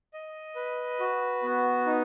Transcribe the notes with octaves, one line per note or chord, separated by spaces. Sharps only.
D#5
B4
F#4
B3
D#4